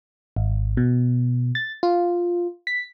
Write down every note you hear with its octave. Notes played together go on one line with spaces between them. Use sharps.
G#1
B2
A6
F4
B6